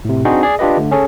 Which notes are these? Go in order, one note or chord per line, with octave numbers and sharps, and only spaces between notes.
A2 C3
C4 D4 D#4 F#4 G#4 C5
G#4 D5
D4 F4 G4 B4 D#5
D3 A3
C#4 G#4 A4 C#5